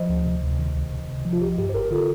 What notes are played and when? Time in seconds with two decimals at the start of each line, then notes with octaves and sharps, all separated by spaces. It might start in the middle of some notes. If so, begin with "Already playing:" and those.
Already playing: F3 C5 D#5
0.09 D2
0.26 C3
0.43 D2
0.59 D#3
0.76 C2
0.93 C3
1.09 C2
1.25 F3
1.33 F4
1.42 F3 G4
1.58 G2 G4
1.69 C5
1.74 G1 G4 A#4
1.91 D3 F4 A4